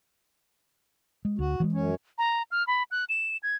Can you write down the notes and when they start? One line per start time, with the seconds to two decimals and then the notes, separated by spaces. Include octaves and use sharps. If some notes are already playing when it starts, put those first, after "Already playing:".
1.25 G#3
1.39 D2 F#4
1.60 E3 G3 G#3
1.72 F#2 C#4
2.18 A#5
2.51 F6
2.67 B5
2.91 F#6
3.09 E7
3.43 G#6